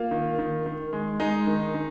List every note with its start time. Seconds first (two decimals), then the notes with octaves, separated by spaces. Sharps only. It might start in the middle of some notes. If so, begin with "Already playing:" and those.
Already playing: A#3 F4
0.11 D#3
0.39 D#3
0.66 D#3
0.93 G#3
1.20 G#3 D#4
1.47 D#3
1.74 D#3